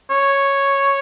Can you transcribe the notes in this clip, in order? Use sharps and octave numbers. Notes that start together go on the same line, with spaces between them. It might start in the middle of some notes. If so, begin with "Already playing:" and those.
C#5